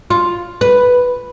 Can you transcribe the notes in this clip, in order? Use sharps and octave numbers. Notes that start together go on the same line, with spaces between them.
F4
B4